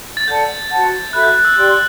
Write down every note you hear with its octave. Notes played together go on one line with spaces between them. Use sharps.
A6
A4 D5 F#5 A5 G6
F#4 C5 F#5 A5
F#4 A4 E5 B5 F#6
G6
F#6
E6
G4 D5 G5 C6 F#6